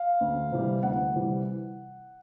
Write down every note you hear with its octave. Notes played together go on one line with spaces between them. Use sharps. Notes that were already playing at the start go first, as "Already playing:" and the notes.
Already playing: F5
D2
C3 E3 G3
D2 F#5
C3 E3 G3